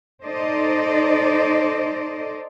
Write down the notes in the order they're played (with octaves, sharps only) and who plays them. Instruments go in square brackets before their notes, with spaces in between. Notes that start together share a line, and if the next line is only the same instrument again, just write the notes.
[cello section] D#4 A4 C5 D5 D#5